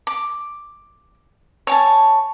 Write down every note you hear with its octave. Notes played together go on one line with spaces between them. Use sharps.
D6
C#5 G#5 A5